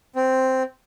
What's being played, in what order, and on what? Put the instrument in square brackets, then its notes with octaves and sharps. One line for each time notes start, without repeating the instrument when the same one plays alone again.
[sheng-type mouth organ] C4